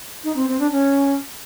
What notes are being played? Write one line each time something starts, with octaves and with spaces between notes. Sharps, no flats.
D#4
C4
C4
D4
C#4